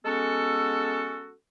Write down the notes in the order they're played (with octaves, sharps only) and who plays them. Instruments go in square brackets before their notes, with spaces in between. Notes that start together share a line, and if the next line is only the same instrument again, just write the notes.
[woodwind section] G#3 B3 C#4 F#4 A4